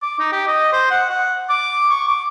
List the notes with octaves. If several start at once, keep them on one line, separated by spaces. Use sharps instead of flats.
D6
D#4
G4
D#5
C5
F#5
F#5
D6
C#6
D6